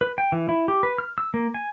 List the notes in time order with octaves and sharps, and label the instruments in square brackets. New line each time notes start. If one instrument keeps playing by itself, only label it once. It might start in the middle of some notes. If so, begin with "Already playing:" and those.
[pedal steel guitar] B4
G5
E3
E4
G4
B4
F6
E6
A#3
G#5